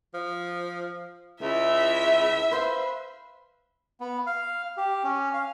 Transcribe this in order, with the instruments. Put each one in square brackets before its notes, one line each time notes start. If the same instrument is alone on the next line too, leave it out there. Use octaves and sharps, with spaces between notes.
[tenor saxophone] F3
[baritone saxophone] C#2 [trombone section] E4 [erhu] E5
[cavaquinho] B4 C5 F5
[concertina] B3
F5
G4
C#4
F5